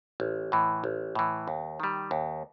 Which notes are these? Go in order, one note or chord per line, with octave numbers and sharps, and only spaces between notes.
A1
A2 E3
A1
A2 E3
D#2
D#3 G3
D#2